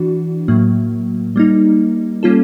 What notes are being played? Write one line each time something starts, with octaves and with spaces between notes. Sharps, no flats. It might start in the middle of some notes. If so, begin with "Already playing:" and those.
Already playing: E3 D4 F#4
A2 F#3 A#3
G3 A#3 D#4
G3 A#3 C#4 F4 A4